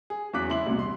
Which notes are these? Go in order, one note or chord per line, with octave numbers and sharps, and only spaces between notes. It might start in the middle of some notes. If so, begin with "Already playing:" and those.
G#4
E2 F#3 C#4 D6 F#6 B6
C#3 G#3 E4 C6 F#7
C2 B2
C6